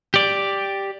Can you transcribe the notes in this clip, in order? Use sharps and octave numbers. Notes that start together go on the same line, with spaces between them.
G4 D5